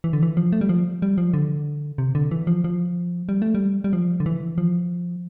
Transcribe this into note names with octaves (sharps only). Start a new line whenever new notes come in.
E3
D3
E3
F3
A3
G3
F3
G3
F3
D3
C3
D3
E3
F3
F3
G3
A3
G3
G3
F3
D3
E3
F3